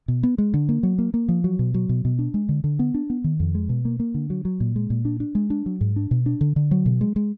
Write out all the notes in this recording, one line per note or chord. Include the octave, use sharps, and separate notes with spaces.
B2
B3
G#3
D3
A#3
F#3
A#3
A#3
F3
F#3
B2
F#3
B2
B2
D4
G#3
D3
D3
B3
D4
B3
D#3
F2
G#3
B2
A#3
A#3
D3
F#3
F#3
A#2
G#3
A#2
D4
D4
G#3
D4
F#3
G#2
D4
B2
D4
D3
D3
F#3
B2
G#3
G#3